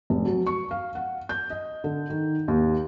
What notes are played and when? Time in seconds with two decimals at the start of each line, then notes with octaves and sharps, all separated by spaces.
0.10 F1
0.25 F#3
0.47 C#6
0.71 F5
0.95 F#5
1.29 G6
1.50 D#5
1.84 D3
2.10 D#3
2.48 D#2